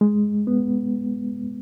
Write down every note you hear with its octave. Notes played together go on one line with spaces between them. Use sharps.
G#3
B3